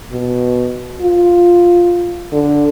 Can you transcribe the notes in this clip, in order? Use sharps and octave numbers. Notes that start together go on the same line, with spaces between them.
B2
F4
D3